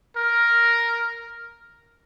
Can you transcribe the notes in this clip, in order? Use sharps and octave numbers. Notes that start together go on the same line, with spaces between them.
A#4